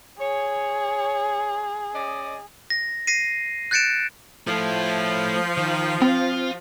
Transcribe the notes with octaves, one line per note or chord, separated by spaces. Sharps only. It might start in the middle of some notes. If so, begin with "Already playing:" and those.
G#4 C#5
C#4 D5 D#5
A#6
A#6 C7 D#7
F#6 G6 A6 C#7 D7 E7
F3 A3 E4
D#3
C4 F4